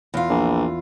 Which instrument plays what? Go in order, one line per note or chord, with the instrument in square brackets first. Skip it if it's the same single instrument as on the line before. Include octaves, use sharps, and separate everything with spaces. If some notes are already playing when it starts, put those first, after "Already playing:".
[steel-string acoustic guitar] E2 F4
[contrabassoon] A#1